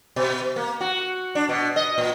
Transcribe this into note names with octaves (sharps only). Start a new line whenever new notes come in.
B2
A#3
F#4
D4
B2
D#5
A#2